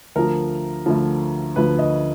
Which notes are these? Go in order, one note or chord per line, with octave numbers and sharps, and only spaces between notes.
D2 D3 F3 A#4
D2 D3 F3
D2 D3 F3 B4
D#5